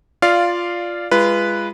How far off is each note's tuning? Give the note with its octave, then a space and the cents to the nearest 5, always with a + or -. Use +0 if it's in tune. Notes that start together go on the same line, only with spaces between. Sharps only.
F4 +0 D5 +0 F5 -10
G#3 -20 F4 -30 B4 -5